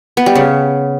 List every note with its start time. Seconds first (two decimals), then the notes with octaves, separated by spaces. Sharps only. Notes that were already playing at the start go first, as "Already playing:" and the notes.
0.17 B3
0.26 G3
0.35 C#3